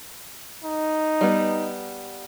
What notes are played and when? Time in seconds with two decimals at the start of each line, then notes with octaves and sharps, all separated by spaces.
0.64 D#4
1.21 G3 B3